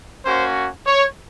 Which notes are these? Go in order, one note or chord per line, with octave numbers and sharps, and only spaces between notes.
A#3 C#4 F#4 C5
C#5